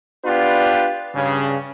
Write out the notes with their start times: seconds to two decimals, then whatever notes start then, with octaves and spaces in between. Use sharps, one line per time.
0.25 B3 D4 F4 G4 B4
1.15 G2 C#3